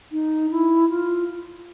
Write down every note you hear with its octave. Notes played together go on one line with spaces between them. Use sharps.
D#4
E4
F4